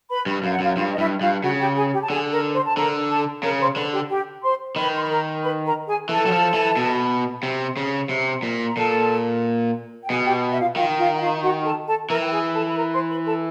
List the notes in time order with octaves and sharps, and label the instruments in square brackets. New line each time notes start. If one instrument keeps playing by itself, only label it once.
[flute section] B4 B5
[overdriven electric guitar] G2
[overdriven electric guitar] F#2 [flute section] F5
[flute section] F#5
[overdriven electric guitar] F#2 [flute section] F4 F5
[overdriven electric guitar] G2 [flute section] F4 F5
[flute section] D#5
[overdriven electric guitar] G2 [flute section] E4 E5
[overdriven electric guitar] G2 [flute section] F4 F5
[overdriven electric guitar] C#3 [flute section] F#4 F#5
[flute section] G4 G5
G#4 G#5
G4 G5
A5
[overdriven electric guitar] D3 [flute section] G#4 G#5
[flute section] A#4 A#5
C5 C6
A5
[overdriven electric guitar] D3 [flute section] A#4 A#5
[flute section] A4 A5
[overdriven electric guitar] C#3 [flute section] A#4 A#5
[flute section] C5 C6
[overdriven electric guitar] D3 [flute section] B4 B5
[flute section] G4 G5
G4 G5
C5 C6
[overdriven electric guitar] D#3 [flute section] B4 B5
[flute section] C6
B5
A#4 A#5
B4 B5
A#4 A#5
G#4 G#5
[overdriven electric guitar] E3 [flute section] A4 A5
[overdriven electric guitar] F#3
F3
E3
B2
C3
C#3
C3
A#2
[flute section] A#5
[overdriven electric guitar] A#2 [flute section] A4 A5
[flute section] G5
[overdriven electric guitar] B2 [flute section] G#4 G#5
[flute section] G4 G5
E5
F4 F5
[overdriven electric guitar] D#3 [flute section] F4 F5
[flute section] F4 F5
F#5
F4 F5
F#4 F#5
A4 A5
A4 A5
[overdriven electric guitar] E3 [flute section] A#4 A#5
[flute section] G5
G#4 G#5
A4 A5
B5
A#4 A#5
C5 C6
B4 B5
A4 A5